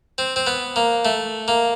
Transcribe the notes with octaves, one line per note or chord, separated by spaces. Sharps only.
C4
C4
B3
A#3
A3
A#3